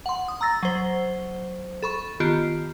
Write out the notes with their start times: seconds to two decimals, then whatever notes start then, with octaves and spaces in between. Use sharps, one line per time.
0.06 F#5 C6
0.28 D#6
0.41 A#5 E6 A6 A#6
0.63 F#3 C5
1.82 A4 B5 C#6
2.20 D#3 B3 F4 G4